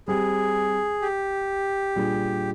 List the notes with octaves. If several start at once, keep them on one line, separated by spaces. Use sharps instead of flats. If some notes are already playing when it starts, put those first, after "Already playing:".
G3 C4 G4 G#4
G4
A#2 G3 D4 G#4